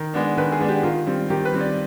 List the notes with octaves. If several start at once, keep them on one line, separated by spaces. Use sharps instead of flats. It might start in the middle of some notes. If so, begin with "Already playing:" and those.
Already playing: D#3
G#3 B3 D4
D#3 B4
G#4
G#3 B3 D4
G4
D#3 F4
G3 C4
D#3 G4
B4
G3 C4
D5